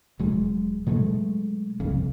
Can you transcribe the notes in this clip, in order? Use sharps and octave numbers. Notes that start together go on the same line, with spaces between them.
E1 F#3 G#3
B2 F#3 G#3 A3
F#1 C2 F2